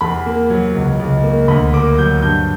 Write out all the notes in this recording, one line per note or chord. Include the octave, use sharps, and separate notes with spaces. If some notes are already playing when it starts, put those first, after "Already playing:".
E2 B5
A#3
F#3
C#2
C#2
A#3
D2 B5
A#3 D6
F#3 G6
G2 G6